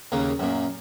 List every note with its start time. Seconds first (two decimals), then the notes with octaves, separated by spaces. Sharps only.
0.12 D#2 C#3 A#3
0.39 F#2 A#2